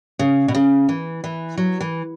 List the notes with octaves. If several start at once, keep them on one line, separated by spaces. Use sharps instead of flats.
C#3
B2
C#3
E3
E3
F#3
E3